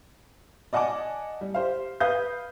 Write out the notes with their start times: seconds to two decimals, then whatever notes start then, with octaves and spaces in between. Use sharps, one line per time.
0.73 D5 D#5 F#5 G#5 A5 D6
1.41 G3
1.54 G4 C5 F5
2.00 B4 F5 D#6 G6